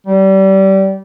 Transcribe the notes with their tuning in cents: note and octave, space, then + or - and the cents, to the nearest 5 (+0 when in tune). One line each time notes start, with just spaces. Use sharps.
G3 -25